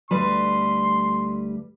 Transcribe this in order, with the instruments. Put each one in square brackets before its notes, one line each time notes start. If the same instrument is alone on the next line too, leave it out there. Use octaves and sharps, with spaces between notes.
[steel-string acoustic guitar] D2 G3 B4 [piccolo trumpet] C6